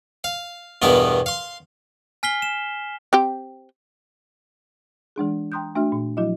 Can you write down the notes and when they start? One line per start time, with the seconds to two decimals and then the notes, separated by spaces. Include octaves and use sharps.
0.24 F5
0.82 E2 G2 B2 B3 A#4
1.26 F5 C6
2.23 G#5 F6 B6 C7 G7
2.42 E7
3.13 C4 G4 G5
5.16 E3 G#3 D4 G#4
5.52 G5 A#5 C6 D#6 F#6 G6
5.75 A3 D4 F#4 E5 F6
5.92 A#2
6.17 F3 F#3 E4 F#4 D#5